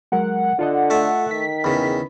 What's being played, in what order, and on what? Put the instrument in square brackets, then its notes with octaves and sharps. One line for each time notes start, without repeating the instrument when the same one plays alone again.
[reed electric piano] F#3 G#3 A#4 [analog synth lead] F#5
[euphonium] D3 [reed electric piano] F4 A4 D#5
[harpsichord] A3 E5
[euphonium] D#3 [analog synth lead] B6
[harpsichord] E2 C#3 [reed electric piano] B5